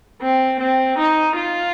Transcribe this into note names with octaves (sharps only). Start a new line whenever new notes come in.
C4
C4
D#4
F4